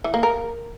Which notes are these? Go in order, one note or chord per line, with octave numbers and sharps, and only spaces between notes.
E3
A#3
A#4